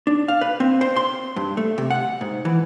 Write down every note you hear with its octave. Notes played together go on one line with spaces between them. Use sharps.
D4
F5
B4
C4
C5
C6
G2
A3
C3
F#5
G#2
E3